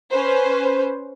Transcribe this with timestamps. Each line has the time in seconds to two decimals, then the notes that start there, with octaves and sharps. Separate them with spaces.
0.11 C#4 B4 C5